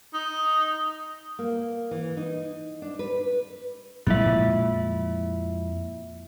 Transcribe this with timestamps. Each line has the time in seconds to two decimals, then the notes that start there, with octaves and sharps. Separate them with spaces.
0.14 D#4
1.39 A#3
1.91 E3
2.17 D#4
2.82 D4
2.99 B4
4.07 F2 A#2 G#3 E4 E5